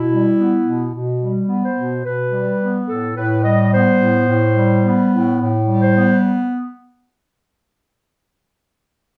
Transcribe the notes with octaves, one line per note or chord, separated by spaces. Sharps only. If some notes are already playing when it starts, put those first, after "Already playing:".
Already playing: B2 E4
G3
B3
B2
B2
G3
B3
C5
B2
B2 B4
G3
B3
A2 A4
A2 B4
G3 D#5
B3 C5
A2
A2
G3
B3
A2
A2
G3
C5
B3